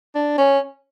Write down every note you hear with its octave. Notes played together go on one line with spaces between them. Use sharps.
D4
C#4